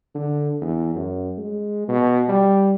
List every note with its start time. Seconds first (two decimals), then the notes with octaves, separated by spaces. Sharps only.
0.15 D3
0.61 E2
0.96 F#2
1.38 G#3
1.88 B2
2.29 G3